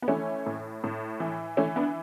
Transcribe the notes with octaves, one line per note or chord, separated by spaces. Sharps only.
B3
E3 A3 C#4
A2
A2
E3
E3 A3 C#4
B3 D4